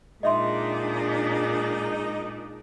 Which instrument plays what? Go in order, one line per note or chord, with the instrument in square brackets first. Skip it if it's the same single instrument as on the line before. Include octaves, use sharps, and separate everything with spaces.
[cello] A#2 D4 [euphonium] G#3 [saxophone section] D#4 [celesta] D#5 E5 C6